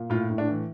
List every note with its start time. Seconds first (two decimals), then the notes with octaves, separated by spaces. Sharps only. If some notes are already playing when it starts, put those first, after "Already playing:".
Already playing: A#2
0.10 A2 F4
0.30 A2
0.38 D4
0.48 E3